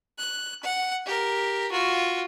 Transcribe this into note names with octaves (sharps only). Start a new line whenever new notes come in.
F#6
F#5
G4 A#4
F4 F#4